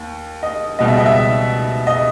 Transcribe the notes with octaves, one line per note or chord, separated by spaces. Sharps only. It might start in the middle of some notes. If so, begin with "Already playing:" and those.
Already playing: D#2
D#5
C#2 B2 G3 D#5
E5
D#5
E5
D#5